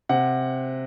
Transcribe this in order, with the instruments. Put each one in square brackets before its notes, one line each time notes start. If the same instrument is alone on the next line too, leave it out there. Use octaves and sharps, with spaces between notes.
[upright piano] C3 F#5